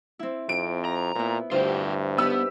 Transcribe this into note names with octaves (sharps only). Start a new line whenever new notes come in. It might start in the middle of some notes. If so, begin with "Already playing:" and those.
C4 E4
F2 D7
A#5
A#2 B3 E4
D2 G2 E4 F4 G4 C5
B3 D#4 G4 B4 E6